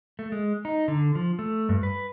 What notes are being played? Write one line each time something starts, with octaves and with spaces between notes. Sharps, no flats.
A3
G#3
D#4
D3
F3
A3
G2
B4